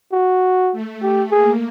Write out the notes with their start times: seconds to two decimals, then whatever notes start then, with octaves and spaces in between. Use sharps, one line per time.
0.13 F#4
0.72 A3
1.02 G4
1.31 A#3 G#4